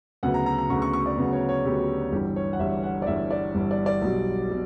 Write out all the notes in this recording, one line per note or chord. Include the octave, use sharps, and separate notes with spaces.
D2 C#3 F#3 B3 F#5
A#5
A#5
A#5
D2 C#3 F#3 B3 C#6
C#6
C#6
D5
D2 C#3 F#3 B3
C#5
C#5
D2 C#3 F#3 B3 G4
F#4
G1 G2 E3 G3 G4
C#5
F#5
G1 G2 E3 G3 E5
F#5
D5
G1 G2 E3 G3 E5
D5
G1 G2 E3 G3
D5
D5
B1 B2 G3
B2 G3